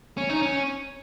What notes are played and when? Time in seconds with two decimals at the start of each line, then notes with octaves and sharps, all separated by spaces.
0.17 C#4
0.29 D#4
0.42 C#4